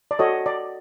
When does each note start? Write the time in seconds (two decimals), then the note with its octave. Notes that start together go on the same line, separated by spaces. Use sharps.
0.11 D5
0.19 F#4 A4 C#5 D#5
0.46 D5